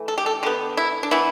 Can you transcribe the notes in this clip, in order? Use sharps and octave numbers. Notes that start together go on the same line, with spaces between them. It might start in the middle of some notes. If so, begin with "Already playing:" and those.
Already playing: E3 A3
A4
G4
A4
D3 B3 G4
E4
D4
E3 B3 E4